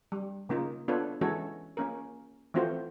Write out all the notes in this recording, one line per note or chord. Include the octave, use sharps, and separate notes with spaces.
G3
C#3 A#3 D#4 F4
B3 D4 F4 A4 B4 C#5
E3 G#3 C#4 F#4 A4 C#5
A#3 C#4 A#4
E3 A3 C4 F4 F#4 C5